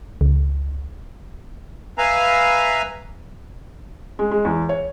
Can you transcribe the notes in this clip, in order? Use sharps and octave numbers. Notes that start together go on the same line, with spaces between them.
C#2
B4 E5 F5 G#5 A#5
G#3
G#3
E2
C#5